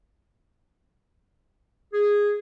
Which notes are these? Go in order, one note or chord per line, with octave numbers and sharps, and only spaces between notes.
G#4